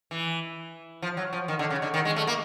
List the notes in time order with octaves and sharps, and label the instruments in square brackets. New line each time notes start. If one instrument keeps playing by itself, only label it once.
[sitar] E3
F3
F#3
F3
D#3
D3
C#3
D3
D#3
G#3
A3
A#3